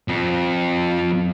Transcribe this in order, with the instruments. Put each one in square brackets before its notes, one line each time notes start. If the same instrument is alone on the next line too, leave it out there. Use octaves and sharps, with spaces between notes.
[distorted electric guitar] F2